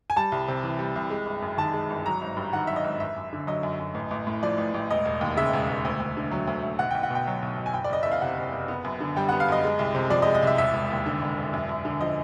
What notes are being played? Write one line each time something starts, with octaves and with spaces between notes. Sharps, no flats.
G#5
G3 A5
C2
C3
E3
G3
C2
G#3
G1
F#2
D#3 A5
G#3
G1
F#3 A#5
G#1
G2
D#3 F#5
F#3 E5
D#5
G#1
F#2 E5
F#2
D3
F#3 D#5
F#2
F#2
A1
A1
A2
F3 D5
A1
A1
E1 D#5
E1
D#2
C#3 E5
E1
E1
D2
D2
D3
F#3
D2
D2
B1 F#5
B1 G5
F#5
B2 G5
F#3
B1
B1
G#5
F#1 G5
D5
F#1 D#5
E2 E5
F5
C3 F#5
F#1
F#1
B3
F#2
D3
G3 G5
B3 F#5
F5
F#2 D#5
G#3
C2
C3
F3 D5
D#5
G#3
D#5
C2 E5
E1 E5
E1
D#2
D3
E1
E1
F#2
F#2
D3
F3 D#5